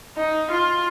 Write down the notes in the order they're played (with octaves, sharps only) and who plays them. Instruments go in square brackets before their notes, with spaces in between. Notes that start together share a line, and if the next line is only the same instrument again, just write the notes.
[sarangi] D#4
F4